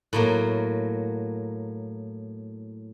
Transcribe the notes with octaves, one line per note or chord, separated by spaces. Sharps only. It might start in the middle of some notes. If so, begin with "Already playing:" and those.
A2 F#3 A#3